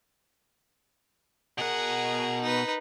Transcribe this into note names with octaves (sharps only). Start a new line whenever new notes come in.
B2 G#4 A#4 F#5
D#4 B4